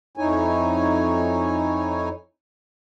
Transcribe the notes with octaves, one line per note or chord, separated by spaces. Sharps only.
F2 D#4 E4 C#5 G#5